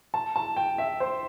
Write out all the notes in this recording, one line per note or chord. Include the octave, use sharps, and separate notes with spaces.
A5
A5
G5
E5
C5